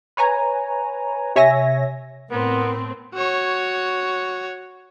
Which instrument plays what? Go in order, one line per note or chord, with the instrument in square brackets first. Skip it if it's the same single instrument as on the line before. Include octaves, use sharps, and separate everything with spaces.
[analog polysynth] B4 C#5 G#5 A#5
C3 C#5 E5 G#5 A#6
[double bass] A2 [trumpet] B3 [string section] C4 [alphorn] A#4
[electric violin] F#4 C#5